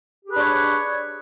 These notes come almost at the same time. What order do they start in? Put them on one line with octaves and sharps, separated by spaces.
G4 G#4 B4 D4 C#5